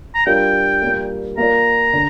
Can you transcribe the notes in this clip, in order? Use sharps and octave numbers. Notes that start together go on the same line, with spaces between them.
A#5
G3 D4 F4 A#4 G5
A#2 G3 A#3
A#3 F4 A#4 D5 A#5
D3